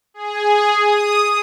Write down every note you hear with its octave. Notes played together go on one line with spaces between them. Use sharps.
G#4
D#6